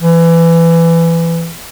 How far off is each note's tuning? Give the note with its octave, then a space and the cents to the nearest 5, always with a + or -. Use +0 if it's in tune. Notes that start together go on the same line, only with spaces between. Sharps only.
E3 +20